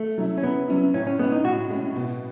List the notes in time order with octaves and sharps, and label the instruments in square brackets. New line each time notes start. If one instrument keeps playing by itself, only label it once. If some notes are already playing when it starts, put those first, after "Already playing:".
Already playing: [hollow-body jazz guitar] A3
[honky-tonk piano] F#3 C#4 E4
[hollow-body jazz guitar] C#4
[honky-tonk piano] C#3 [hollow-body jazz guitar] B3
[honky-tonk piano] F#3 C#4 E4
[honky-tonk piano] A2 [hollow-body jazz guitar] C#4
[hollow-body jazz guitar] C#4
[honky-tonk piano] G#3 C#4 [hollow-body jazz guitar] B3
[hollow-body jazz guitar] D#4
[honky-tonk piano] A2 [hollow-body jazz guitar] F#4
[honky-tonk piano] G#3 C#4
B2